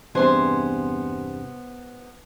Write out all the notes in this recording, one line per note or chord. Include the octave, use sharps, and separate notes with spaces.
E2 G2 C3 B3 C5 G#5 C6